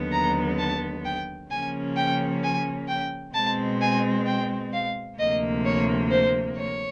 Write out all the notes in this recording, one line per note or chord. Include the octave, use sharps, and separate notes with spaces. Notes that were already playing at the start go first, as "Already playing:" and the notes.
Already playing: D#2 D3 F#3 B3
A#5
A5
G5
C#3 F3 A#3 C#4 G#5
G5
G#5
G5
B2 G#3 C4 A5
G#5
G5
F5
D2 C3 F3 A#3 D#5
C#5
C5
C#5